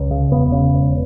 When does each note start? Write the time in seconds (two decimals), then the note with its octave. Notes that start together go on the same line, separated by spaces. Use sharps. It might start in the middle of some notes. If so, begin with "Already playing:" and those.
Already playing: C#2
0.11 C#3
0.32 E1 B3
0.52 C#3
0.74 E1